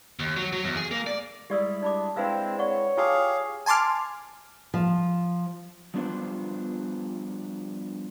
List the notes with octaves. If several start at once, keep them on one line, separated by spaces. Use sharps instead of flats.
D#2
F#3
F#3
E2
G#4
A#3
D5
G3 G#3 E4 G4 D5 E6
D4 D5 B5 D6
G#3 C4 D4 E4 B4 F5 E6
C#5 D5 F#5 C#6
F4 G4 G#4 F5 A5 C6
G#5 A5 C6 D6 F6
F3
F3 G3 B3 D4 F4 C5